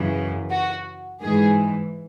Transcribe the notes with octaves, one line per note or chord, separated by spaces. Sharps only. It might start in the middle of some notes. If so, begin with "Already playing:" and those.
Already playing: F#2 C#3 E3
F#4
G#2 E3 G#4